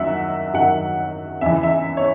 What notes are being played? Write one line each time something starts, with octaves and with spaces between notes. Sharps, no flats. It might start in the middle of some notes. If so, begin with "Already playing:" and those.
Already playing: F#2 D#3 F#3 E5 F#5
F#2 D#3 F#3 F#5
E2 C#3 E3 E5
E5
C#5